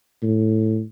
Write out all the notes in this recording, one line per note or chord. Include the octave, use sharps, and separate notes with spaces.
A2